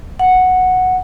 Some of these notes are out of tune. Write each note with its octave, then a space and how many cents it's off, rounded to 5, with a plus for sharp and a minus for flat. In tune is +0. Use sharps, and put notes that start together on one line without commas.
F#5 -5